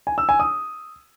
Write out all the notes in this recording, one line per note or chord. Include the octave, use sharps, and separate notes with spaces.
G#5
E6
G#5
D#6